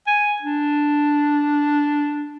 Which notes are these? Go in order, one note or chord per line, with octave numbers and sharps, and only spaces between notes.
G#5
D4